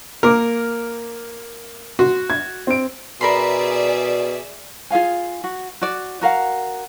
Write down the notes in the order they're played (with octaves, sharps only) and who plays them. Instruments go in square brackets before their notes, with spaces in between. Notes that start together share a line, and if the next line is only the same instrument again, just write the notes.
[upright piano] A#3 D6 [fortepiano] A#4
[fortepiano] F#4 [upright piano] C6
[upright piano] G#6
C4 D7
[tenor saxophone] B2 [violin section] G#4 D5 E5 [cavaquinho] A#4 B5 C6
[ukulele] F4 G#4 F5 G#5
F#4
F#4 D5
F#4 A#4 F5 F#5